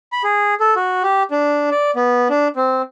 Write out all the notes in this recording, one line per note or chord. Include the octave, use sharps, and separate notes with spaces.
B5
G#4
A4
F#4
G4
D4
D5
B3
D4
C4